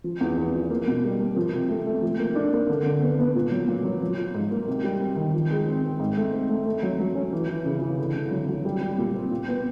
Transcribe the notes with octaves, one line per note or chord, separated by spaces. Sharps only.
F3
E2
E2
F3
A#3
B2
G3
A#3
F3
C3
A3
A3
F3
A#3
D4
A#3
D3
D3
B3
B3
A#2
F#3
A#2
F#3
F3
F3
G#2
A#3
C3
G3
C4
D#3
F3
G#3
C4
C4
G#2
A3
C4
A3
A3
F#3
F#3
C#4
E3
E3
C#3
E3
D3
D3
F#3
F#3
G3
G3
A#2
C4
A#2
B3